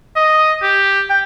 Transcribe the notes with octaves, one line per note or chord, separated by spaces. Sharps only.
D#5
G4
G5